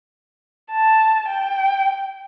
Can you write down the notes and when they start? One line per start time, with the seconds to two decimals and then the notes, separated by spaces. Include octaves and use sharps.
0.71 A5
1.28 G5